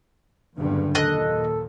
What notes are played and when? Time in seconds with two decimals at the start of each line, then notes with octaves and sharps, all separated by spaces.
0.57 F#1 E2 G2 D3
0.95 D#2 A#2 A4 D#5 F#6